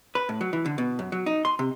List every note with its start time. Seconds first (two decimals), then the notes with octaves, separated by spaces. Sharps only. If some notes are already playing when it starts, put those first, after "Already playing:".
0.15 B4
0.29 A2
0.41 F#3
0.53 E3
0.66 D3
0.78 B2
0.99 F#2
1.12 F#3
1.26 D#4
1.45 C6
1.59 C3